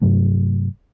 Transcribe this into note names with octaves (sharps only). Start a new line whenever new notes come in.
G2 C3 F#3 A3